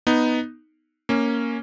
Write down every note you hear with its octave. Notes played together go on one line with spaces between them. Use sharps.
B3 D#4
A#3 C#4